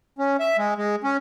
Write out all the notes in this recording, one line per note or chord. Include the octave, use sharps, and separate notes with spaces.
C#4
E5
G#3
G#3
C#4